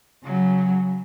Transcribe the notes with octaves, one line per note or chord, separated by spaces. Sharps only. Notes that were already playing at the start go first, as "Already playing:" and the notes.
C#3 F#3